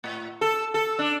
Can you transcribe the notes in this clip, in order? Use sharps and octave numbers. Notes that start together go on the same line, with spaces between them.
A2
A4
A4
D4